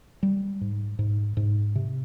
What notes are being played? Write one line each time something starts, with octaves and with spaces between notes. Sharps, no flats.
G3
G#2
G#2
G#2
C3